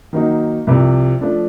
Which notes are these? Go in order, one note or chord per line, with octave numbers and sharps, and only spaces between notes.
D#3 F#3 A#3 D#4 F#4
C2 C3 F3
F3 A3 D4